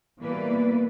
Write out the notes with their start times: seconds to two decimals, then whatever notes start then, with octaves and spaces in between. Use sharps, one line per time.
0.20 B2 E3 G3 A#3 B4 D5